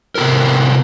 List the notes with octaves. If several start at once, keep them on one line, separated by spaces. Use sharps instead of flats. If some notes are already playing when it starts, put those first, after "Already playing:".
C3 B3 F#4 A4 A#4